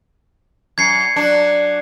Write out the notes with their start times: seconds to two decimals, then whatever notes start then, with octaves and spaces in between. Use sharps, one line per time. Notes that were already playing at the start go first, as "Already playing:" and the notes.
0.78 F#2 G#6 C7 C#7
1.16 F#3 D4